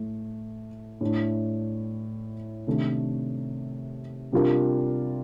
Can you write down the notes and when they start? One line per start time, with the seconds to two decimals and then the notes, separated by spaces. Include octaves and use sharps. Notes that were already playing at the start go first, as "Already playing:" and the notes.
Already playing: A2 A3
1.01 A2 A3 D4
2.67 C3 D#3 A3 D4 A4
4.32 C3 G3 D4 F4 A#4